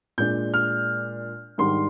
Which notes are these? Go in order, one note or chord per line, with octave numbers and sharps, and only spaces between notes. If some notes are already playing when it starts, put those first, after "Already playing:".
A#2 G#3 D4 G6
F6
G#2 D#3 G3 D4 C6